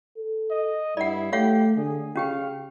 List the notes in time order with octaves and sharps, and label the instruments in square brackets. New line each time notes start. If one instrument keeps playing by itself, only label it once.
[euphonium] A4
[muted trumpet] D#5
[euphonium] G2 [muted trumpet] E4 [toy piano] D5 F#5
[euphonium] A3 [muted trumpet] G4 [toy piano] C#5 F5 F#5
[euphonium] D3 [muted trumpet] G#4
[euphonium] C#3 [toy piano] C#4 G4 G5 [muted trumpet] F5